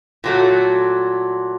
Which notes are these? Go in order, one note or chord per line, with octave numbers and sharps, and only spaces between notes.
A#2 F#3 A3